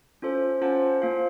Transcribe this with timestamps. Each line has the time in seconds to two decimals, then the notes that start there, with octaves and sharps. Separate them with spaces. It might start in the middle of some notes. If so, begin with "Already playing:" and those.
0.22 C#4 F4 A4 C5
0.61 C#4 F4 C5 F#5 A5
1.02 A#3 F4 C5 F5